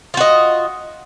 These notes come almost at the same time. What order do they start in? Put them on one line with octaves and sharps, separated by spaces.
F4 F#4 D#5